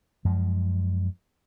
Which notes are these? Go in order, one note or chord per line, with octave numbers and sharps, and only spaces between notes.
F#2 F3 G#3